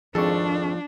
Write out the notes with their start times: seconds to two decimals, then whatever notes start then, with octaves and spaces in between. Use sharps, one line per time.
0.15 G#1 F2 F3 D4 G#4 A4 C#6